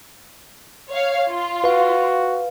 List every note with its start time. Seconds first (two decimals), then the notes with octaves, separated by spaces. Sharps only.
0.91 C#5 F5
1.30 F4
1.64 F#4 B4 F5